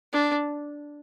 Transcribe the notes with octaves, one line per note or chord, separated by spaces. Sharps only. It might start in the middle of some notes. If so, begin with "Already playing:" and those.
D4